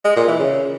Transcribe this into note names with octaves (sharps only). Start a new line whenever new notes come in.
G#3
A#2
E3
C#3